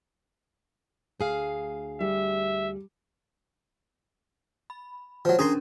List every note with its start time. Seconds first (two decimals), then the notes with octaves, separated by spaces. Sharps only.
1.20 D2 G#4 F5
2.00 G3 E5
4.70 B5
5.25 F3 F#3
5.39 C#4 D4 G#4 A#4 A#5 C6